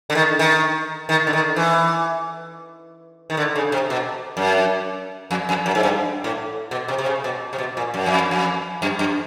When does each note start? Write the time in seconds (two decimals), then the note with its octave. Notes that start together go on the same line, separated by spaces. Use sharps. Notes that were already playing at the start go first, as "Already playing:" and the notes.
0.10 D3
0.15 D#3
0.39 D#3
1.09 D#3
1.27 D3
1.33 D#3
1.56 E3
3.30 D#3
3.37 D3
3.55 C#3
3.72 C3
3.90 B2
4.37 F#2
5.31 F2
5.49 F2
5.66 F#2
5.75 G#2
5.83 G2
6.24 A2
6.71 B2
6.88 C3
6.98 C3
7.06 C#3
7.24 B2
7.53 C3
7.58 B2
7.77 A#2
7.94 F#2
8.06 F2
8.31 F2
8.82 F#2
8.99 F#2